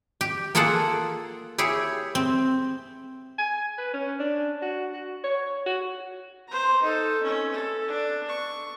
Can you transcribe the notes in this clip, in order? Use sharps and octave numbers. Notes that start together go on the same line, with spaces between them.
G4
A#3 F4 G#4 A4 F#5
E4 G4 G#4 C#5
C4
G#5
B4
C#4
D4
F#4
F#4
C#5
F#4
C5 A#5
D#4 A4
C#4
A4
D4
C#6